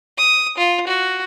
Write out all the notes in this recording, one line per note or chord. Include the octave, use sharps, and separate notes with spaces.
D#6
F4
F#4